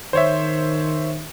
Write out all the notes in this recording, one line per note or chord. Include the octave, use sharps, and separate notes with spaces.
D#3 C5 C#5 E5